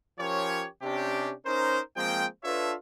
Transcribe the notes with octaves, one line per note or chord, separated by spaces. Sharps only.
F3 C#4 G4 A#4 C#5
C3 C#4 D4 G4
C#4 D#4 A#4 C5
F3 G#3 A#3 C4 G5
D4 F4 A4 B4 C#5 E5